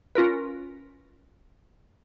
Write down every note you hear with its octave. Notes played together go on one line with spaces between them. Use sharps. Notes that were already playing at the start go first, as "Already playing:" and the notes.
C#4 F4 A#4 B4